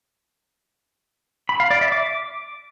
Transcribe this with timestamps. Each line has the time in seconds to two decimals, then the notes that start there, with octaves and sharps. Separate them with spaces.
1.49 B5
1.60 F5
1.71 D5
1.81 E5
1.92 D6